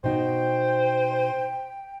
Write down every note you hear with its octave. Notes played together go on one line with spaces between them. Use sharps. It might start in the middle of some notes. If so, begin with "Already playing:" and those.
B2 D#4 F#4 C5 G5